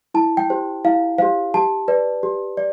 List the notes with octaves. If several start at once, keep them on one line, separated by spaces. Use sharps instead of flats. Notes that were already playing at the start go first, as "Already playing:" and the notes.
E4 A5
G5
G4 C5
E4 F5
G4 C5 F5
G4 A5
B4 D5
G4
D5